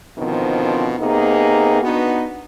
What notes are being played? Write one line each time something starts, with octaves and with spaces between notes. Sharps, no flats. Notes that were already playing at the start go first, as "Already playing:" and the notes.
B2 D3 D#3 F3 C4
C3 A#3 B3 D#4 G#4
B3 D4 D#4 F#4 B4